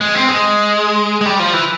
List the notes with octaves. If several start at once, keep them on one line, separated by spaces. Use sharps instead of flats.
G#3
C4
G#3
G#3
G3
F3
E3